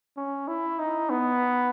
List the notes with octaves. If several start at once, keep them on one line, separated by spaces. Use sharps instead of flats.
C#4
E4
D#4
B3